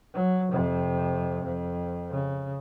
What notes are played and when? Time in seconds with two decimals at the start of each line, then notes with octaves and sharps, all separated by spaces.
0.14 F#3
0.51 F2 C3
1.44 F2
2.10 C#3